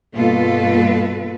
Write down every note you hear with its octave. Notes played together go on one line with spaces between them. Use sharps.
G2 B2 A#3 F4 A4 B4